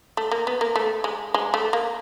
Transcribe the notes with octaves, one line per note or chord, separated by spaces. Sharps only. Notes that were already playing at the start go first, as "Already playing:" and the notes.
A3
A#3
B3
A#3
A3
G#3
G#3
A3
A#3